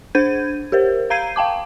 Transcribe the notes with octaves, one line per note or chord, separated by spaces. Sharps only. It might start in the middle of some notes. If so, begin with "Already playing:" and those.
D4 C5 G6 G#6 D#7
G4 A#4 C5
F5 A#5 G6 G#6 C7 D#7
F5 G5 A5 D6